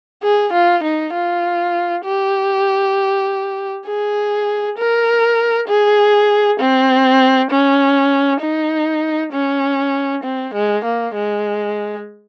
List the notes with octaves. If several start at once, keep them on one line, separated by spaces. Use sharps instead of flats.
G#4
F4
D#4
F4
G4
G#4
A#4
G#4
C4
C#4
D#4
C#4
C4
G#3
A#3
G#3